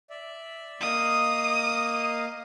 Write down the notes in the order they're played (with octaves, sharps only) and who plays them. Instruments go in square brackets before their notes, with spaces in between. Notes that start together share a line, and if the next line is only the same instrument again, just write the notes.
[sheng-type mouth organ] D5 E5
[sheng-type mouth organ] A#3 D#5 F5 [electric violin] D#6